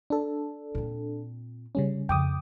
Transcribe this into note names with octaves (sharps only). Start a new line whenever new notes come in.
D4 A4
A#2 C4
C#3 G3 C#4
F2 C#3 G5 D6 D#6